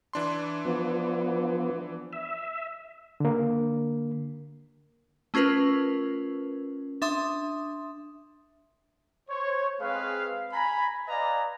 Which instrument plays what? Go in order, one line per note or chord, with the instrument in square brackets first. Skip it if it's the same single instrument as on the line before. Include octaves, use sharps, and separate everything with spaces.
[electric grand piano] E3 D4 C6
[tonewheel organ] F3 B3
E5
[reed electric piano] D3 A#3
[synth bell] A3 C#4 F4 A#4 B4
D4 E5 C6 D#6
[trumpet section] C5 C#5
G#3 C4 G#4 B4 F5
G#5 A#5 B5
B4 D5 D#5 F5 G#5 A#5